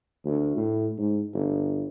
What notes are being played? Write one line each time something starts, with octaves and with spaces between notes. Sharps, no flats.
D2
A2
G#2
G1